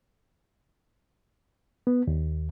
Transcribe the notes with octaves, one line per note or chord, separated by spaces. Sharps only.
B3
D#2